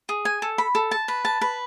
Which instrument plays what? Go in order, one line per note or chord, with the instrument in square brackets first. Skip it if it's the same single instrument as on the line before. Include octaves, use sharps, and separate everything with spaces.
[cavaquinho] G#4
G#5
A4
B5
A4
A5
B4
A5
B4